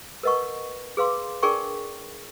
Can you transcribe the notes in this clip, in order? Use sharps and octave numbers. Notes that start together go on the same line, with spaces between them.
A#4 B4 D#5 F#5 C#6
G#4 B4 F5 C6 D6
D4 G#4 A#4 D5 G5 C#6